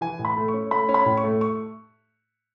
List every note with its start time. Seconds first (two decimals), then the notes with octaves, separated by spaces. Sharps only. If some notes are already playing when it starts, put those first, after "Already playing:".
0.01 E3 G#5
0.19 A2
0.25 B5
0.37 A3
0.48 C#6
0.54 C#4
0.71 A3 B5
0.89 C#4
0.94 B5
1.06 A2
1.17 C#6
1.24 A3
1.41 C#6